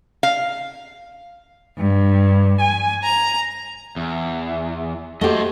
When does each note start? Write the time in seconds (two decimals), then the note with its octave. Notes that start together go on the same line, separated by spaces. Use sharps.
0.23 F5
1.77 G2
2.60 G#5
3.03 A#5
3.96 E2
5.21 A3 F#4 G4 C5 D#5